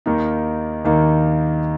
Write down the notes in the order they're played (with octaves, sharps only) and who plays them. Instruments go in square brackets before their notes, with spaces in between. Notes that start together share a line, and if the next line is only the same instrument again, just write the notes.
[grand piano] D#2 D#3 A#3 D#4
D#2 D#3 A#3 D#4